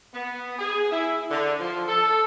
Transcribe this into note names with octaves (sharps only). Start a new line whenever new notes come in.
B3
G#4
E4
D3
F3
A4